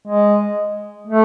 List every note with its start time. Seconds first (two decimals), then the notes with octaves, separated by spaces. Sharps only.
0.07 G#3
1.07 A3